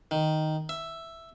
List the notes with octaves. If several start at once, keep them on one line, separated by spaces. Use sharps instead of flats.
D#3
E5